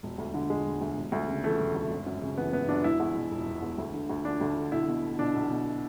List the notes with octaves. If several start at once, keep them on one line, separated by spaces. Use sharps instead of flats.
E1
D2
D3
E1 G#3
E1
D2
E1
D2
C#3
E3 A3
E1
D2
G#1
F#2
C#3
E3 B3
G#1 B3
F#2 D4
E1 E4
E2
B2
E1
E1
E2
D2
D3
D2
D3 D4
D2
D3
B1 E4
B2
B1
B2 D4
B1
B2